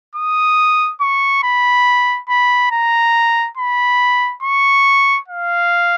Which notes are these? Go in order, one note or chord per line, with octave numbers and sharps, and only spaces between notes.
D#6
C#6
B5
B5
A#5
B5
C#6
F5